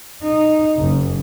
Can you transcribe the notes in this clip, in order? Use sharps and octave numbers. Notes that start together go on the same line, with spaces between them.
D#4
F#1